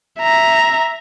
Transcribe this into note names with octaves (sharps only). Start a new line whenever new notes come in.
E5 A#5